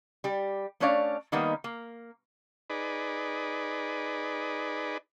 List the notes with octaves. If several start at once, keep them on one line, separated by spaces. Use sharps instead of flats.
G3 G4
A3 C#4 D4 C#5 D5 F5
D#3 G3 A#3 B3 D#4
A#3
D#4 G#4 B4 D5